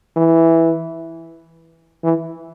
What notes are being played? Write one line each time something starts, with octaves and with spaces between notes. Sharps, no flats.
E3
E3